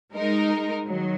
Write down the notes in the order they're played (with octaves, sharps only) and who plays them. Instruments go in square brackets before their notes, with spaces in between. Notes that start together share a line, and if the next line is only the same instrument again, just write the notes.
[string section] G#3 D#4 A#4
D#3 F#3